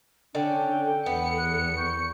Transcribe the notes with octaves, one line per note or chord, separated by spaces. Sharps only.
D3 C#4 D4 G5
A4
E2 B3 C#7
F#6
C#6 G6